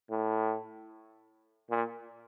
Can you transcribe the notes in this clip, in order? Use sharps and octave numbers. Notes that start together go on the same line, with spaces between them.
A2
A#2